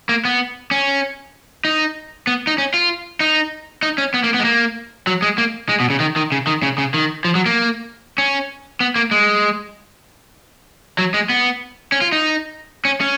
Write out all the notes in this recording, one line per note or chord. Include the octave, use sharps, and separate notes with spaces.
A#3
B3
C#4
D#4
B3
D#4
C#4
F4
D#4
D#4
C#4
B3
A#3
B3
G#3
A#3
F#3
G#3
A#3
G#3
B2
C#3
D#3
D#3
C#3
D#3
C#3
C#3
D#3
F3
F#3
A#3
C#4
B3
A#3
G#3
F#3
G#3
B3
C#4
F4
D#4
C#4
C#4